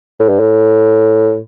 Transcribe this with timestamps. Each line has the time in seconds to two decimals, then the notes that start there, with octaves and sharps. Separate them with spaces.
0.19 A2
0.29 G2
0.40 A2